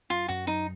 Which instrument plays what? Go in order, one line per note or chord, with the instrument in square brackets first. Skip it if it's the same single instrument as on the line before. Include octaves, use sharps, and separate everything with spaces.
[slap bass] F#2 [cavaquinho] F4
[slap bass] F#2 [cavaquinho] F#4
[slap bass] F#2 [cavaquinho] D#4